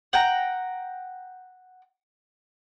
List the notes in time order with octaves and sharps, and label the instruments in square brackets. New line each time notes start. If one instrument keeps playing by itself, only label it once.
[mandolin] F#5 G5 A#5